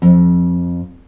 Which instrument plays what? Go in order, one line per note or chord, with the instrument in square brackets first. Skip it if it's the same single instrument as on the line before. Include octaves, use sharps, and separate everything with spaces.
[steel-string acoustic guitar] F2